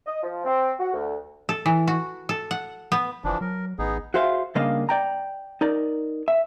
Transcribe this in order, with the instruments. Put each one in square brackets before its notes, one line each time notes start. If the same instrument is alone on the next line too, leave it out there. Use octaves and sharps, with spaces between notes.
[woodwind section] D#5
F3
C4
F#4
D2
[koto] A4
E3
F#4
A4
F#5
B3
[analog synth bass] F#1 [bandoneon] E3 F3 D4
[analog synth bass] F#3 [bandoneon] A#4
[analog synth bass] A1 [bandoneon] B3 D#4 G#4
[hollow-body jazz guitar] F#4 G#4 C5 E5 F5
C#3 G3 A#3 D4 D#5 F5
D5 G5 A#5
D#4 A#4 D5
E5